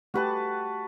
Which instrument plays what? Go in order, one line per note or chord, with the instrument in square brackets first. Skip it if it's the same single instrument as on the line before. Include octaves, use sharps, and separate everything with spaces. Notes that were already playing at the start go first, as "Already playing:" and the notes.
[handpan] A3 G4 [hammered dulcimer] F#4 B4 A5